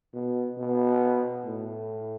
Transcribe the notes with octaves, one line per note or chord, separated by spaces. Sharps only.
B2
B2
A2